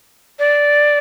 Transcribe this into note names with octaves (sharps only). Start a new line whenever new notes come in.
D5